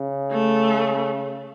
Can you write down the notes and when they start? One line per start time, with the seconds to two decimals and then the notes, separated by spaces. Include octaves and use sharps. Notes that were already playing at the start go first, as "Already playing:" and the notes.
Already playing: C#3
0.31 A3